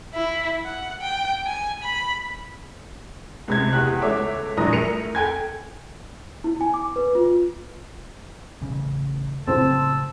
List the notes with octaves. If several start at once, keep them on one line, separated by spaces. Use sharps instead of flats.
E4
F#5
G5
G#5
B5
C#2 C3 G#6
E2 G4 F#6
C#2 A4 C#5 E5 D6
A#1 G2 E3 A#5 D#6 A#6
A2 E4 A#4 C#7 D#7 F7
A4 G5 G#5 G#6
E4
G#5
D6
B4
F4
A1 C#3
A2 C#3 F#3 C4 A5 E6